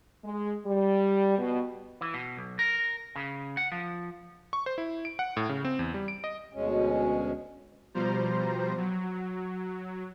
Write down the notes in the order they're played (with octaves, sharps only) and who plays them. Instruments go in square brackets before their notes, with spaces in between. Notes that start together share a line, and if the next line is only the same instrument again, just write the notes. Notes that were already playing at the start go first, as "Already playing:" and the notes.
[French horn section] G#3
G3
B2
[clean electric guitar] E3
B2
B1
A#4
C#3
F#5
F3
[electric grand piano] C#6
C5
E4
D7
F#5
A2
C#3
C4
E2
G3
D7
D#5
[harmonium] D2 B2 G#3 C#4
[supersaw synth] B2 F3 G3 C5 A#5
F#3